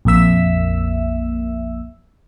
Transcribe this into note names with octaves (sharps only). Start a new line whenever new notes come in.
A#1 F2 A#3 E5 E6